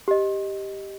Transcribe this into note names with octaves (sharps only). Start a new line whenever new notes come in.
G4 D#5